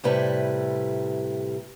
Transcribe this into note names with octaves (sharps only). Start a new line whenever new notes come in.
A2 C3 G3 E4 B4